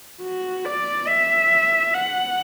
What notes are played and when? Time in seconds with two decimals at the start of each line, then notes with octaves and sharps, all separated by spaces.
0.22 F#4
0.65 D5
1.08 E5
1.94 F#5